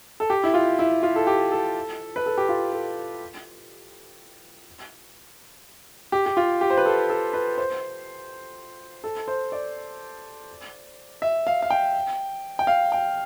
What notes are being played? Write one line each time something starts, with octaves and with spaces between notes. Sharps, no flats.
A4
G4
E4
F4
E4
F4
A4
G4
A4
B4
A4
G4
F4
A4
G4
G4
F4
G4
C5
B4
A4
A4
B4
C5
A4
C5
D5
E5
F5
F5
G5
G5
F5
G5